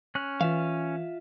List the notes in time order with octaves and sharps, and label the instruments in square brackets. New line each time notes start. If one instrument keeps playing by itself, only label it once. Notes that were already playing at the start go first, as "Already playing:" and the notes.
[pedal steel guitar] C#4 F#6
[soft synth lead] E3 [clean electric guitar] F4 E5 F5